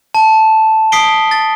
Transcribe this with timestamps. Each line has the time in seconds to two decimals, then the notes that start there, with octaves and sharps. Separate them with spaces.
0.15 A5
0.92 D#6 B6 C7 D7 G7
1.31 A6